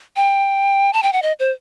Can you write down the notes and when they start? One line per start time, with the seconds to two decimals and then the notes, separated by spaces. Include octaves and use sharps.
0.16 G5
0.93 A5
1.03 G5
1.13 F#5
1.22 D#5
1.39 C5